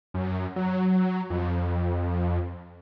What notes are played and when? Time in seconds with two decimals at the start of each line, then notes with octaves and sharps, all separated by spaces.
0.14 F#2
0.56 F#3
1.30 F2